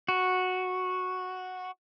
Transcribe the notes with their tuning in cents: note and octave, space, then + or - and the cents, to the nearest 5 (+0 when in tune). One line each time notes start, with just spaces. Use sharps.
F#4 -5